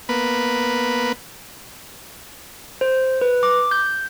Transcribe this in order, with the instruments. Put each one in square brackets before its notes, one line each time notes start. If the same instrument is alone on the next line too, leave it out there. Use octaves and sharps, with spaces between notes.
[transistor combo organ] A#3 B3 B4
[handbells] C5
B4
D6
G6